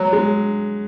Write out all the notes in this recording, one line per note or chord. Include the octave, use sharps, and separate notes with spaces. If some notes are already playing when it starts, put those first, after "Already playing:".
Already playing: F#3
G#3